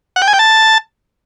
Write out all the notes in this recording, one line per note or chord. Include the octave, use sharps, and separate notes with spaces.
F#5
G5
G#5
G5
A5